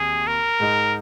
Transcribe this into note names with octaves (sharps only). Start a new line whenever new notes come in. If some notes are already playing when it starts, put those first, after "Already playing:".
Already playing: D#2 D#3 C4 G#4
A#4
G#2 G#3 D#4